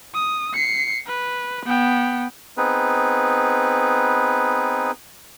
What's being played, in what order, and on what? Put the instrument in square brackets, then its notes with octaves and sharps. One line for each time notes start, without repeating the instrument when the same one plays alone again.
[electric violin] D#6
C7 C#7
B4
B3 G5
[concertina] B3 C4 D#4 G#4 B4